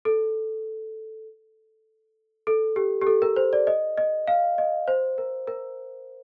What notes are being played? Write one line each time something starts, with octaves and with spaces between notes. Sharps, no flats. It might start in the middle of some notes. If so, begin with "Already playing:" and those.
A4
A4
G4
G4
A4
A#4
C5
D5
D#5
D#5
F5
D#5
C5
A#4
A#4